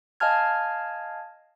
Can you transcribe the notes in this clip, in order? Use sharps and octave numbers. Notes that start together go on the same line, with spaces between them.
D#5 F5 G#5 A5 F6 G#6